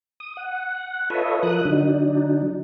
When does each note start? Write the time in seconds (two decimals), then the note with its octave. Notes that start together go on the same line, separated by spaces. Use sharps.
0.20 D#6
0.37 F#5
1.10 F4 A4 B4 C#5 D#5 E5
1.43 F3 A#4 D#6 F#6
1.65 D3 F#3 D4 D#4